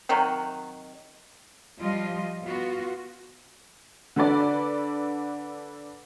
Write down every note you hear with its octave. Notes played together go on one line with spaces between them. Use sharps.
C3 D#3 F#3
F3 G3 F4 D#5
B3 F4 F#4
D3 A4 B4 D5